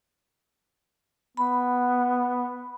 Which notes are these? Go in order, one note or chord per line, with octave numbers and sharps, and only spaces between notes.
B3 B5